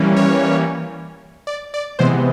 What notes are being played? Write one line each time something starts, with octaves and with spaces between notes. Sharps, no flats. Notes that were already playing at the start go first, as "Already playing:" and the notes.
Already playing: E3 G3 A#3 C#4
C#5
D5
D5
C3 E3 G#3 B3 C5